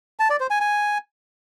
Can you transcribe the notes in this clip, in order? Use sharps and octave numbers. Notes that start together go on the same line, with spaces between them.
A5
D5
C5
G#5
G#5